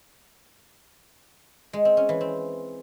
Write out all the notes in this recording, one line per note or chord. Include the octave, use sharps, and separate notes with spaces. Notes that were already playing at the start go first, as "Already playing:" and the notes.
G#3
C4
C#4
E3
C4